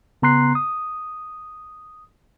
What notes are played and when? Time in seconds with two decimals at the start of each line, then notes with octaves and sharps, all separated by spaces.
0.22 C#3 B3 A#5 C6 F#6 C7
0.55 D#6